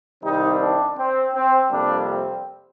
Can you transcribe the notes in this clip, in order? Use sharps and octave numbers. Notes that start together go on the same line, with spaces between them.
C2 C3 D#3 G3 C4 D#4
D4
C4
C4
F2 C3 G3 A#3 D4
C4